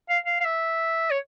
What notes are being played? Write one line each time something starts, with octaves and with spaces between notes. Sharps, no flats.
F5
F5
F5
E5
C#5